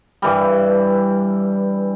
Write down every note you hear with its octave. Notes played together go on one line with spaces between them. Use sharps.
G2 E3 G3